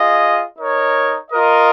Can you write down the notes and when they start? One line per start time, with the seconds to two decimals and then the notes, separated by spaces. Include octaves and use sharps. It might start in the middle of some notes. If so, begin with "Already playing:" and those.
Already playing: F4 G#4 D#5
0.59 D#4 A#4 C#5
1.31 F4 A#4 D#5